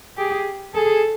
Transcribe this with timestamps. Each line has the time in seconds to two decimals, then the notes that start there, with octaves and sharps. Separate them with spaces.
0.17 G4 G#4
0.74 G#4 A4